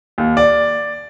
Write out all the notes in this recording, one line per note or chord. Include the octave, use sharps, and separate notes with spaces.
D#2
D5